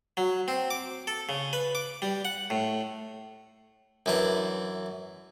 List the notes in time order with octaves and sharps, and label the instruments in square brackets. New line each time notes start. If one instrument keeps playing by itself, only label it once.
[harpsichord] F#3
C4
D6
A4
C#3
B4
D6
G3
F#5
A2
F#2 E3 D4